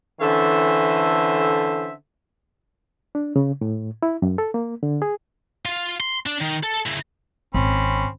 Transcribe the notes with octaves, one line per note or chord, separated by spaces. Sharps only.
D3 E3 C#4 A4 C5 E5
D4
C#3
A2
E4
F#2
A4
A#3
D3
G#4
F4
C6
D4
D#3
A4
C#3 E4
G#1 C4 C#4 B5